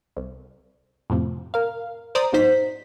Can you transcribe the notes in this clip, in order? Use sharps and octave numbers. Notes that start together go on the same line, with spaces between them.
C2
F2 A2 C3 F3
A#4 F5
C5 D5 A#5 D#6
B1 G#2 D#4 C5 B6